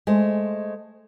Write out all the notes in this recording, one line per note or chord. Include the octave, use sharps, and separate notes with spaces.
G#3 A3 C5